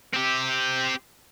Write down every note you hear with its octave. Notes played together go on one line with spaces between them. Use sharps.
C4 G4